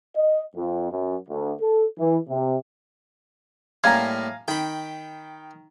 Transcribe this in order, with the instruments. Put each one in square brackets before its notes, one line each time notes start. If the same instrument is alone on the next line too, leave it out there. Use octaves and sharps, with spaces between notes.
[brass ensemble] D#5
F2
F#2
D2
A4
E3
C3
[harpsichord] A2 G3 A#3 [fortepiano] F5 G#5 A#5 [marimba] G#6
[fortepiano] D#3 [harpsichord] G5 B5